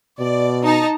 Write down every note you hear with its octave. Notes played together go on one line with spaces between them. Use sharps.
B2 D5
D#4 A5 A#5